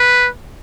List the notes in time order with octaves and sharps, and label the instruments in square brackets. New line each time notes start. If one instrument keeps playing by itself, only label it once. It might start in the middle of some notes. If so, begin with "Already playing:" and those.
Already playing: [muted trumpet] B4